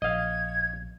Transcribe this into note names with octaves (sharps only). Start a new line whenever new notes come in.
A#1 D#5 F5 G#6